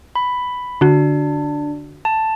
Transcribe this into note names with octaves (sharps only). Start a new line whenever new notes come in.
B5
D3 D4 F#4
A5